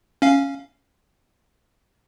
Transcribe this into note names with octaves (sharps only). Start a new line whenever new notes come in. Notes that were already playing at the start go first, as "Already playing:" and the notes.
C#4 F5